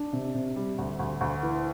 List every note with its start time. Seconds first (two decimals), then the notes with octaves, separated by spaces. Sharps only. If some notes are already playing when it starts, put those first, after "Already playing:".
Already playing: D4
0.13 C3
0.35 C3
0.56 G3
0.78 D2
0.99 D2
1.21 D2
1.43 E3